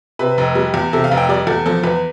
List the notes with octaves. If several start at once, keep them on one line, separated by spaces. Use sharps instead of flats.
C3 B4
F1
G3
E2
C3 A4
F5
F1
G5
G3 D5
E2 A4
F3 A4
E2 B4